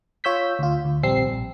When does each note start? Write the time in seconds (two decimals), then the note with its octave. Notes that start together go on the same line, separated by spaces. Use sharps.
0.24 F4 C#5 E6 G6 B6
0.59 D2 F4
0.85 D2
1.03 A#1 G3 C4 E6 C7
1.24 A#1